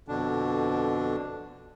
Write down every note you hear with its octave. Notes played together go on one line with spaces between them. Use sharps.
F2 B2 D3 D4